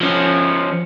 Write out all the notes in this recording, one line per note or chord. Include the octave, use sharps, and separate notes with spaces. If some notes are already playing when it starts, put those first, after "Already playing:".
F3 C#4